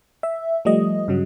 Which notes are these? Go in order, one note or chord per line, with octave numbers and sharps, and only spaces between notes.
E5
F3 G3 A3 D#5
G2 C#3 F#3